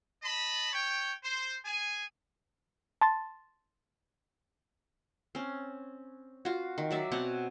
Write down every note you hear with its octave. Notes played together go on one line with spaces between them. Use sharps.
D#5 A5 B5
C#5 G5
C5
G#4 G#5
A5 C6 A6
C4 C#4
F4 F#4
D#3
F#3 D5 E5
B2 C4 C#5 F#5